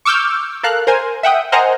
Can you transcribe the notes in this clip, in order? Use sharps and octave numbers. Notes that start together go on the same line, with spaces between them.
C#6 D6 E6 F6 G6
A4 A#4 F5 F#6
A#4 C5 G#5
E5 F#5 G5 D#6
A#4 C5 D#5 F#5 G#5 A#5